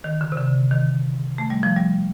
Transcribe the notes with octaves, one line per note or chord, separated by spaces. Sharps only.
D#3
D3
C3
D3
D#3
A3
G3
F3
G3